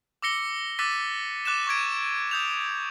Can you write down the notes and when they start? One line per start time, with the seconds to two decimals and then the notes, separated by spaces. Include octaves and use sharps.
0.22 D6 E6 A#6 C#7 G7
0.79 D6 E6 F#6 A6 B6 D#7
1.45 D6 F#6 A6 E7
1.67 C#6 F#6 G#6 D7
2.31 D#6 G6 F7